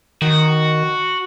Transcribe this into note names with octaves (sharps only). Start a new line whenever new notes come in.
D#3 F#4